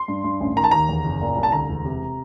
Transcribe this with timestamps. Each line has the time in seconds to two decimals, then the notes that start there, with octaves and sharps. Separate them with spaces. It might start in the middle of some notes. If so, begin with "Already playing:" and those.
Already playing: C6
0.08 G2
0.24 G2
0.41 A1
0.56 D#3 A#5
0.64 A5
0.71 D#2 A#5
0.89 E2
1.04 F#1
1.21 A#2
1.36 C2
1.43 A5
1.52 D2 A#5
1.69 E1
1.85 C3